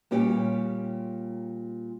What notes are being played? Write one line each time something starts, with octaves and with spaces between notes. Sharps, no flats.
A#2 G3 C#4 G4